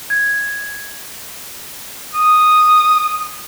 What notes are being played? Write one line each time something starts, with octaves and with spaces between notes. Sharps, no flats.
G#6
D#6